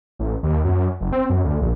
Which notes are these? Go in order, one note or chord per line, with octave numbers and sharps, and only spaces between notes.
A1
D#2
F#2
F#1
C4
F#2
D2
A#1